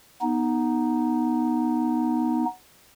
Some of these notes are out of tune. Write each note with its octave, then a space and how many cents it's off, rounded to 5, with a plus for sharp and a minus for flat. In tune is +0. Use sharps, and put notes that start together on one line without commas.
B3 -10 D#4 +0